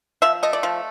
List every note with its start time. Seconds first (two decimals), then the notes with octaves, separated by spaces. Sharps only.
0.22 F3 E5
0.43 A3 D#5
0.53 D5
0.63 F3